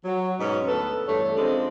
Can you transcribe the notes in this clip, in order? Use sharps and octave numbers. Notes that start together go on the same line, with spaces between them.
F#3
G#2 B2 C#4
D2 B3 A4 B4
E2 G2 A3 A4 C#5
C#3 F3 G#3 C4 D4